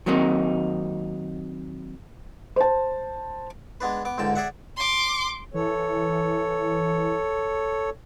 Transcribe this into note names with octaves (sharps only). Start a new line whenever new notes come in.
D#3 F#3 A#3 C4 D#4
C5 A5
G#3 B3 D4 B4
B3 D6
C#2 G#2 D3 G5 A5
G#4 D5 E5 F#5
C6 D6
E3 A4 C#5